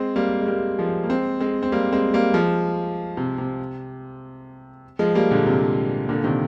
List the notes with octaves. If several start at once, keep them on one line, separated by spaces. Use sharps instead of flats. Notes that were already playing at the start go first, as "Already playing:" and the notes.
Already playing: G#3 C4
G3 A#3
G#3
G3 A#3
F3 G#3
A#3
G#3 C4
G#3 C4
C4
G3 A#3
G#3 C4
G3 A#3
F3 G#3
C3
C3
F3 G#3
G3 A#3
A#2 D3
C3
A#2 D3
C3 D#3